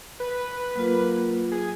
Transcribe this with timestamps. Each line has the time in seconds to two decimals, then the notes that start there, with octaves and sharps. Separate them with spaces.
0.20 B4
0.76 F#3 A#3 F4
1.52 G#4